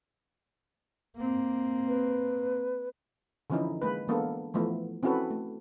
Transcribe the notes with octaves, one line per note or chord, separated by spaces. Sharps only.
A#3 C4
B4
D3 E3 F3 C#4 D#4 E4
G#3 A#3 B4
E3 G#3 A#3 B3 D4 A4
E3 F3 A3 B3 E4
C4 C#4 E4 F#4 A4 B4
A3